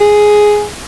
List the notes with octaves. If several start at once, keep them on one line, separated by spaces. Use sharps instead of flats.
G#4